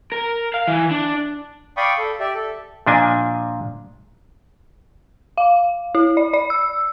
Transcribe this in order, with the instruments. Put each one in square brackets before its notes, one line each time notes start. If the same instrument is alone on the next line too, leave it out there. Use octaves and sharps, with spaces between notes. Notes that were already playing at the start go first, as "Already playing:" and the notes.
[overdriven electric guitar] A#4
F5
E3
D4
[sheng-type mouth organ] D5 F5 G5 B5 C#6 D#6
A4
G4 D5 E5
A4
[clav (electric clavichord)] A#2 F3 D4 D#5 G#5
[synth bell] F5
E4
D5
D5
E6